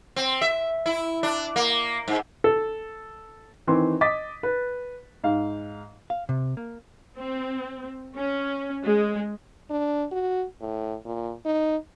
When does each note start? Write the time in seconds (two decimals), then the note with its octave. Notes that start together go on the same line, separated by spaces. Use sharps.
0.16 C4
0.41 E5
0.86 E4
1.23 D4
1.56 A#3
2.08 G#2
2.44 A4
3.67 D#3 E3 C4 C6
4.01 D#5 D6 A6 B6
4.43 B4
5.24 G#2 F5
6.10 F5
6.29 C3
6.57 A#3
7.16 C4
8.15 C#4
8.85 G#3
9.70 D4
10.12 F#4
10.61 A2
11.05 A#2
11.45 D#4